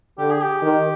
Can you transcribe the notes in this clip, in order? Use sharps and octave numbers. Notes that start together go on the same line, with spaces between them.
D3 G4
G#4
G4
D#3